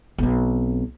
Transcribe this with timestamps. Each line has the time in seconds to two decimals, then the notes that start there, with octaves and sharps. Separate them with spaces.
0.18 B1 C4